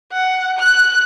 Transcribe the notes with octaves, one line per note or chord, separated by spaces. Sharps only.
F#5
F#6